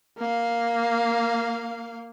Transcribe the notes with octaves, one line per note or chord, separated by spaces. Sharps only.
A#3 F5